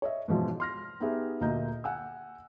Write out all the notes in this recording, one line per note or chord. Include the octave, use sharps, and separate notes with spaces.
C#5 D#5 E5
G#2 B2 E3 F3 G#3
C6 F6 A#6
B3 D#4 G4 G#4 B4 E5
D2 A#2 A#3 D#5 A#5 G6
F#5 G#5 E6